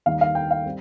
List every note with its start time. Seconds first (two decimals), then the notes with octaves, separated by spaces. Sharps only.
0.06 D#2 D#3 G3 F5
0.21 F5
0.35 G5
0.51 F5
0.66 G3 C4